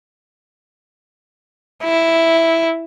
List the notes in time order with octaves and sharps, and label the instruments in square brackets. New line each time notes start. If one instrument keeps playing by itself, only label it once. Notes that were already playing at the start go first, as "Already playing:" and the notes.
[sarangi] E4